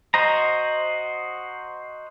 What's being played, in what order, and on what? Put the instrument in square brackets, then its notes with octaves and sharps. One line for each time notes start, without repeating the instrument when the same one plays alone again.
[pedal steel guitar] F#4 C5 D#5 A#5